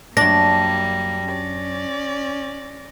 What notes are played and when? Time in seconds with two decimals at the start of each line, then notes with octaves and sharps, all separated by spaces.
0.17 F#2 G3 A#3 D4 A#6
1.26 C#4 D5